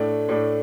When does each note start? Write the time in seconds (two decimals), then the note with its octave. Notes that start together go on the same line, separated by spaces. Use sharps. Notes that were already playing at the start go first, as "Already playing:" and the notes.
Already playing: A2 A3 D4
0.29 A2 A3 D4